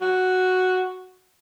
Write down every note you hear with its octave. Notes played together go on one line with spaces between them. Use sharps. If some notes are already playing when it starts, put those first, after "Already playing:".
F#4